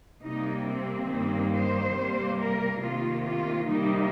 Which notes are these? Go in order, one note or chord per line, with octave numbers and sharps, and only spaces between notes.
C3 G3 A#3 D#4
C4
G2 D#3 G3 A#3
C5
C3 G3 A#3
A#4
C3 D#3 A#3 F4
F4
C3 D#3 G3 A#3 D#4